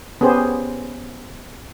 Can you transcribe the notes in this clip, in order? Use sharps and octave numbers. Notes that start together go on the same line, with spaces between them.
B3 C#4 G4 G#4 C5